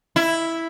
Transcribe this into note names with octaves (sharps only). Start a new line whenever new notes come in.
E4